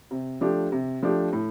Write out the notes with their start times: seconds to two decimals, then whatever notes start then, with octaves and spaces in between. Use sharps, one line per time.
0.11 C3
0.41 F3 A3 D4 G4
0.72 C3
1.03 F3 A3 D4 G4
1.33 A2